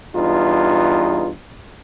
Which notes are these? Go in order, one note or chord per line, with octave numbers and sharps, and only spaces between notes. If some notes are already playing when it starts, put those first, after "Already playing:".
E2 G2 D#4 F4